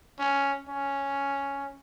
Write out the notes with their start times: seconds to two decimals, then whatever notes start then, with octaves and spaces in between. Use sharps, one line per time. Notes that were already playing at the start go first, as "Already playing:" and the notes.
0.19 C#4
0.68 C#4